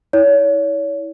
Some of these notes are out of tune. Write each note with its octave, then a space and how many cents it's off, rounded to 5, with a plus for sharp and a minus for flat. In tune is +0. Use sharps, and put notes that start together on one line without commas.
E4 -25 C#5 +30